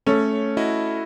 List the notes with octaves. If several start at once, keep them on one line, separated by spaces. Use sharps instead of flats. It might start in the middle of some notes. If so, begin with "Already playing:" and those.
A3 C#4 C#5
E4 F#4 D#5